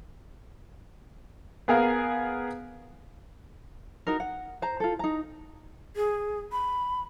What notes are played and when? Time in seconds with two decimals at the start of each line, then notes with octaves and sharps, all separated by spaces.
1.68 B3 G#4 A#4 F5 G#5
4.07 D#4 F#4 A#4
4.20 F#5
4.62 C5 A#5
4.80 F4 A4
4.99 D#4 A#5
5.96 G#4
6.52 B5